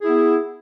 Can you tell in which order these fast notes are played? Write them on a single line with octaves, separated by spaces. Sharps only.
G#4 E4 B3